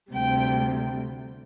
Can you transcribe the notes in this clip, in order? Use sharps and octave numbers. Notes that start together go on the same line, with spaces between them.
D2 C3 G3 G5